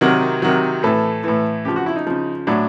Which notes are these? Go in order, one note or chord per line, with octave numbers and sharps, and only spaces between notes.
C3 D#3 F#3 A#4
C3 D#3 F#3
A2 E3 A4
A2 E3
C#3 F3 G4
F#4
E4
D#4
C#3 F3
A2 F#3 D4